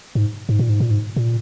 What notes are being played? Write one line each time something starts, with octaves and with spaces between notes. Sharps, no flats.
G#2
G#2
A#2
G#2
A#2
G#2
A#2